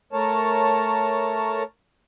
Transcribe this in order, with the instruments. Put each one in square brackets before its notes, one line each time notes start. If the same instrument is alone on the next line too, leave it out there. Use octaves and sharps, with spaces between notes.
[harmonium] A3 A#4 C#5 A5